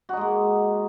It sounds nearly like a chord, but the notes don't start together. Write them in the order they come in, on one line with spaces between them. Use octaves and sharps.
F#4 D#4 G#3 A#3